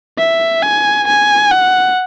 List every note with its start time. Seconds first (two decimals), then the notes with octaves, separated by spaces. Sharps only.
0.18 E5
0.63 G#5
1.08 G#5
1.51 F#5